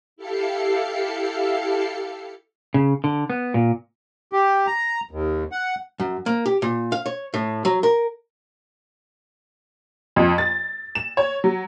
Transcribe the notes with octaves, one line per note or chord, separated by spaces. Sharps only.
E4 G4 A4 F5 C7 C#7
C#3
D3
B3
A#2
G4
A#5
D#2
F#5
F#2
A#3
G4
A#2
F5
C#5
A2
F#3
A#4
F2
A6
E7
C#5
F#3